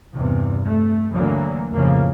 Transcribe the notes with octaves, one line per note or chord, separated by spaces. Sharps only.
E2 G2 C3
A3
D2 D3 E3 F#3 A#3
F2 A2 C#3 E3 F3 A#3